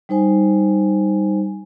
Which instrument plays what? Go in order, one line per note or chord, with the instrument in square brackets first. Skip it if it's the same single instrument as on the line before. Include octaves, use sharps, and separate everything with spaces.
[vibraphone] G3 D#4 C5 G#5